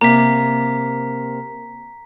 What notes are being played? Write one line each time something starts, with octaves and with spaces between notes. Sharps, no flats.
C3 A#3 A#5 B6